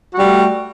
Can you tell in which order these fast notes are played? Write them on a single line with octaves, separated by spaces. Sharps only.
F#4 G3 A3